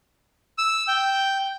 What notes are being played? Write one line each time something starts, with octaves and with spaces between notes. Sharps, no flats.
E6
G5